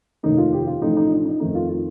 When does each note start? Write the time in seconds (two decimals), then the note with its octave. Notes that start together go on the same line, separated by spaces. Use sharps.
0.23 F1 D#2 D#3 A3 D#4
0.38 F4
0.53 G4
0.67 F4
0.82 A1 A2 F3 A3 D#4
0.97 D#4
1.11 D4
1.25 D#4
1.40 F2 D#3 A3 D#4
1.55 F4
1.70 F4